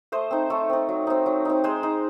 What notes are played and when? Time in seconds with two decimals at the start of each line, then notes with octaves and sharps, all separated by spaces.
0.12 A3 C5 D#5
0.31 C4 D#4
0.50 A3 A4 C#5
0.69 C4 D#4
0.89 F#3
1.07 C4 D#4
1.26 F#3
1.45 C4 D#4
1.64 G#3 G#4 C5
1.83 D#4